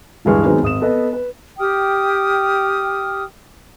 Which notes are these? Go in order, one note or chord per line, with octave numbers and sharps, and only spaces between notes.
D1 G2 E3 G#3 C#6 F6
D#3 F#3 G#3 B3 C4 D#4
G#1 D#6 E7
B3 A4 B4 D#5
B4
G4 G5 D#6 F6